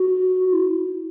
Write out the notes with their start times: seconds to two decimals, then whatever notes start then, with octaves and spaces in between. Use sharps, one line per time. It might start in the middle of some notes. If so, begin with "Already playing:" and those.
Already playing: F#4
0.52 E4